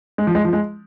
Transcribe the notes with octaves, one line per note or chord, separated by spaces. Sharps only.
G#3
F3
G#3
F3
G#3